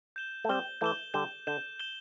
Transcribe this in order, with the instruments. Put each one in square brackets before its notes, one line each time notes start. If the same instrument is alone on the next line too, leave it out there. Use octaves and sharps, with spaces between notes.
[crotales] G6 E7 G7
[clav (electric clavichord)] A3
[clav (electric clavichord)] G3 C4 [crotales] G6 E7 G7
[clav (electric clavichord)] E3 A3 [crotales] G6 E7 G7
[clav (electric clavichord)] D3 G3 [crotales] G6 E7 G7
[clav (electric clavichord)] D3 [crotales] G6 E7 G7
[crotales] G6 E7 G7